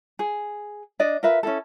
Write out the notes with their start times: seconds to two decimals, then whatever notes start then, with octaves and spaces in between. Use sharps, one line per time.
0.19 G#4
0.99 D4 D5 D#5
1.23 F4 A#4 B4 E5
1.43 C#4 E4 A4